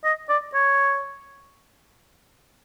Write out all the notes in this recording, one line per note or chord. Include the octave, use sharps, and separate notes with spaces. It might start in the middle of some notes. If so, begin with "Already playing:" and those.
D#5
D5
C#5